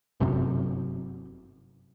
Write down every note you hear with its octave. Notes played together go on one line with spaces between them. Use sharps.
G1 F#2 C3